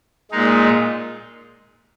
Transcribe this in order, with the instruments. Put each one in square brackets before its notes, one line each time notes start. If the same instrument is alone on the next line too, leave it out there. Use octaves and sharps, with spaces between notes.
[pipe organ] A#2 G#3 D#4